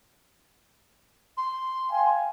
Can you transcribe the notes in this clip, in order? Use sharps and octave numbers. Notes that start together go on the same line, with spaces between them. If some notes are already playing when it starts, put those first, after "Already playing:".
C6
F5 G5 G#5